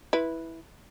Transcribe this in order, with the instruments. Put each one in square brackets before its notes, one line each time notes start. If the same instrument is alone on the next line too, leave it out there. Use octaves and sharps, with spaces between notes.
[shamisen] E4 B4